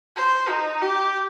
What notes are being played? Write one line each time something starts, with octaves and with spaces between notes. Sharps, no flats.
C5
D#4
G4